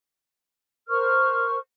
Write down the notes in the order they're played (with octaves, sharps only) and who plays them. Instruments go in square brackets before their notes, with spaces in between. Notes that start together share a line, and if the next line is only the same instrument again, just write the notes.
[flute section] A#4 C5 C#6 F6